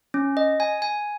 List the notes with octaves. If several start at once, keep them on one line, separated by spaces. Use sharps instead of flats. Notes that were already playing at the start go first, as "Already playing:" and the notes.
C#4
D#5
G#5
G#5